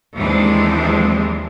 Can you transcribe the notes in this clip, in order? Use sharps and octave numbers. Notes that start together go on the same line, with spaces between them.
D#2 E3 F3 G#3 C4 D4